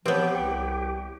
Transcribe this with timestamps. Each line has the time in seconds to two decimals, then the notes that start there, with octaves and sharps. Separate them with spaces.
0.06 F3 B3 C4 G4 B4 C#5
0.35 C2 G5